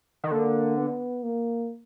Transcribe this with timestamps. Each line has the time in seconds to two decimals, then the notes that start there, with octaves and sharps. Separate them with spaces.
0.24 D#3
0.31 D3 A#3
0.77 B3
1.23 A#3